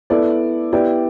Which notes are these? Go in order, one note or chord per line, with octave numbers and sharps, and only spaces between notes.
B3 E4 A4 D5
B3 E4 G4 D5